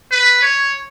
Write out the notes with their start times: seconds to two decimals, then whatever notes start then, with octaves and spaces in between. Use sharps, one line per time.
0.12 B4
0.42 C#5